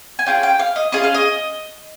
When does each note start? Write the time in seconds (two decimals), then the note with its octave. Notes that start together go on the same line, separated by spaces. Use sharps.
0.19 G#5
0.26 C#4 F4 G#4 G5
0.43 G5
0.59 F5
0.76 D#5
0.92 C#4 F4 G#4 D#5
1.04 F5
1.14 D#5